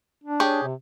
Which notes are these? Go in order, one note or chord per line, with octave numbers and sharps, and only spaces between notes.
D4
G4 G#4 C#5
C3